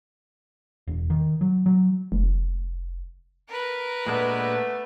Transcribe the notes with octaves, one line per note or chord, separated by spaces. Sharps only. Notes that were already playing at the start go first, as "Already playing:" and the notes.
E1
D#3
F#3
F#3
F1
A#4 B4
A#2 G#3 A3 B3 D4